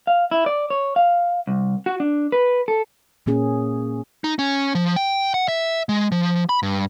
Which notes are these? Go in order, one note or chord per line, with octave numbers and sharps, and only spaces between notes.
F5
E4
D5
C#5
F5
C2
F#4
D4
B4
A4
A#2 A#3 C#4 G#4
D#4
C#4
F3
G5
F#5
E5
G#3
F3
B5
G2